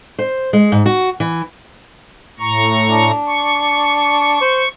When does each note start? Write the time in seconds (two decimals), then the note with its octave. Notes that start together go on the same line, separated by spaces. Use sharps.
0.19 C5
0.53 G#3
0.72 G#2
0.86 F#4
1.20 E3
2.40 A2 A#5 C#6
2.90 D4
3.27 C#6
4.41 C5